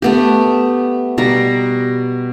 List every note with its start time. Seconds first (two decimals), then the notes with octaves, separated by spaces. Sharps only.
0.02 A3 B3 G4
1.18 B2 G3 A#5